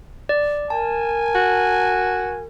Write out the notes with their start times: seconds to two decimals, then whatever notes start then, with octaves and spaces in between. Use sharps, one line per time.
0.29 D5
0.70 A#4 G#5 A5
1.35 F#4